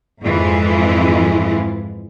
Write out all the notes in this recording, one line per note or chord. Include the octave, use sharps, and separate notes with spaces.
F2 G#2 E3 G#3 E4 F4